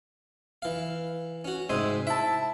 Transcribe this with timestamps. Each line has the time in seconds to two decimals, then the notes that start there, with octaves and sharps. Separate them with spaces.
0.62 E3 F5
1.45 C#4 F#4
1.69 G#2 C3 C5 D#5 E5 G#5
2.07 E4 E5 A5